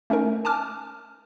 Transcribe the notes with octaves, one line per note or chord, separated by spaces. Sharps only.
A3 C#4 D#4 A#4
G#5 A5 D6 F6